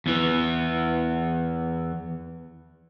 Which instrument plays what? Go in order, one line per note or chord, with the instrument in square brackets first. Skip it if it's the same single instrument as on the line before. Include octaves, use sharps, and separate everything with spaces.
[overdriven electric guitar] E2 E3